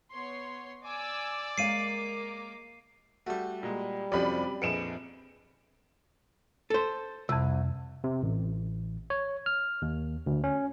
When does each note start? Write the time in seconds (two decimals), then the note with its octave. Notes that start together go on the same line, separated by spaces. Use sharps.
0.11 B3 C#5 C6
0.83 D5 G#5 D6 E6
1.58 G#3 A#3 C#5 F5 D6 C7 D#7
3.27 G3 A3 F#4 C#6
3.63 A#2 G3 G#3
4.12 F2 C3 F3 F#3 C4 C#4 D5 B5
4.62 A#1 F2 G#4 B4 C#7 D7 E7
6.70 A4 C5
7.29 C2 F2 C3
8.04 C3
8.23 A1
9.10 C#5
9.46 F6
9.82 D#2
10.26 D2
10.44 C#4